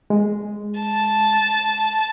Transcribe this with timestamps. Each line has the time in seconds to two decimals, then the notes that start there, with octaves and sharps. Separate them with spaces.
0.10 G#3
0.79 A5